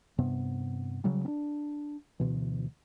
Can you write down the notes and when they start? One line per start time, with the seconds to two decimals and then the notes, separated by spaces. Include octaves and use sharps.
0.18 G2 C3 B3
1.04 C#3 F#3 G3
1.25 C4 D4
2.20 D2 B2 E3